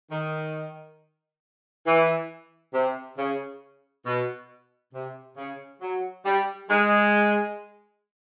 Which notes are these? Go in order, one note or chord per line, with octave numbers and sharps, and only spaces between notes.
D#3
E3
C3
C#3
B2
C3
C#3
F#3
G3
G#3